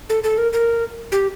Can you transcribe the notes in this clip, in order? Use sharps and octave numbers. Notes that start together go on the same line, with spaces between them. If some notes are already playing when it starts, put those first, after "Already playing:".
A4
A4
A#4
A#4
G4